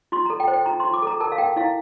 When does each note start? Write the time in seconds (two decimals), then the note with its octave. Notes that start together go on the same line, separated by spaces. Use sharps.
0.12 F4 C6
0.26 A#5
0.30 A4
0.40 G5
0.48 C5
0.53 G5
0.66 F4 A#5
0.80 C6
0.85 F4
0.94 D6
1.03 A4 A#5
1.20 A#4 A5
1.32 F5
1.38 A#4 G5
1.56 E4 F5